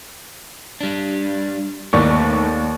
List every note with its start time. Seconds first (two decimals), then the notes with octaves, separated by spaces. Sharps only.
0.81 G3 D4
1.93 D#2 A3 B3 D#4 D5 C#6